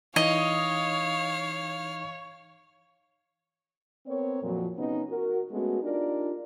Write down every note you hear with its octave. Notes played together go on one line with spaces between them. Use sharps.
E3 D#4 C#5 D#5 F5 D#6
B3 C4 A#4 C#5
F2 A#2 F3 F#3
C3 B3 C#4 D#4
F#4 A#4
G#3 A3 B3 C#4 F#4
D4 D#4 F4 G4 A#4 D5